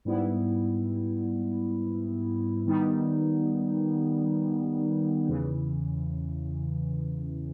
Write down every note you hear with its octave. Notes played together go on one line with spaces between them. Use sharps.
G#2 G3 B3 E4
D#3 G3 B3 D#4
E2 C#3 E3